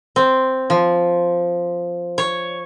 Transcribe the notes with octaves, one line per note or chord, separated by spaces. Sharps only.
C4
F3
C#5